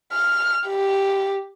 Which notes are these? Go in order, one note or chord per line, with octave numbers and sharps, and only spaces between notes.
F6
G4